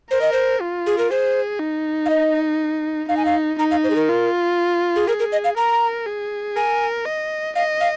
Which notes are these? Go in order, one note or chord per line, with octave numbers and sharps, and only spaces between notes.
A#4 C5
D#5
C5
F4
G#4
A#4
G#4 C5
D#4
F5
D#5
D#4 F5
G#5
F5
D#4 A#5
F5
C5
G#4
A#4
F4
G#4
G#4 A#4
A#4
D#5
F5
A#4 A#5
G#4
A#4 G#5
D#5
D#5 F5
F5